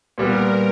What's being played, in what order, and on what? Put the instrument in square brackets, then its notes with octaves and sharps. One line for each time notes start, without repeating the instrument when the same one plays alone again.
[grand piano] A#2 G3 B3 [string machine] A#4